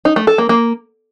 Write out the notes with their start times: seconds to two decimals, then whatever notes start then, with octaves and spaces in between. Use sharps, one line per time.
0.05 D#4
0.16 A3
0.27 A4
0.38 A#3
0.49 A#3